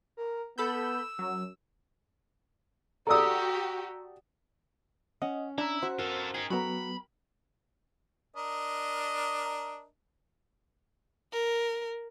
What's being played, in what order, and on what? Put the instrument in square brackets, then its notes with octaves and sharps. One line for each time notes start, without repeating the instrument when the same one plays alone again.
[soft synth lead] A#4
[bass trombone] B3 [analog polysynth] A4 B5 G6 [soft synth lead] E6
[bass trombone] F#2 [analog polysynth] F#3
[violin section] F#4 G4 [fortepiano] A4 D5 D#6 [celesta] A#5 E6
[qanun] C#4 [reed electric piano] D#5 [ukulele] F#5
[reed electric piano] D4 [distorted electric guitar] E4 [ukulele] A#5
[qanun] F#4 [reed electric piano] C5
[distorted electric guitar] F4 A4 [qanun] A#4
[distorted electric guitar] D#4 G#4 [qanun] G5
[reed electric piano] F#3 B3 [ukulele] F#4 A4 A#5 [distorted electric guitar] B5
[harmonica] D4 A#4 D#5
[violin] A#4